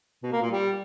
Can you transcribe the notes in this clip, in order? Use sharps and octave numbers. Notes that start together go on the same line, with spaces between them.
B2
A#3
A#2
G3